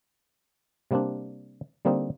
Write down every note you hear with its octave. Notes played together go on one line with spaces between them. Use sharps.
C3 G3 A#3 C4 D4
D3 G3 A#3 C4 D#4